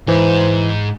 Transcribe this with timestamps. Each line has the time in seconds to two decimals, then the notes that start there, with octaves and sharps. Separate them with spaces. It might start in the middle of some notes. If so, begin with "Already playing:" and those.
0.08 G#2 E3 C5